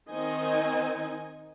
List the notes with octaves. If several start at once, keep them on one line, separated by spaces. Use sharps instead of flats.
D#3 C4 D#4 D#5 G#5